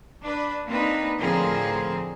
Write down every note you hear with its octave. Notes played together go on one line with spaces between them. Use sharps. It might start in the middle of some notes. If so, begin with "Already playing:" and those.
D4 B4
A#3 C4 D4 D#4 B4
A2 D3 F3 C4 G#4 A#4